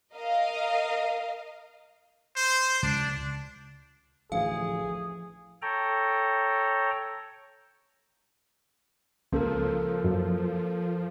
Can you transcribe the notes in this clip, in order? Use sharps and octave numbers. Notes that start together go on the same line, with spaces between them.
A#4 D#5 F5
C5
C#2 D4
A1 D2 E3 F3 G#4 F5
A4 C#5 G5 A#5
C#2 F3 A#3 A4 A#4
F#2